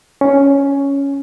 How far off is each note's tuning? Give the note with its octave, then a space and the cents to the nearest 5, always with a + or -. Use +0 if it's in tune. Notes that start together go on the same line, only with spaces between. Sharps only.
C#4 +5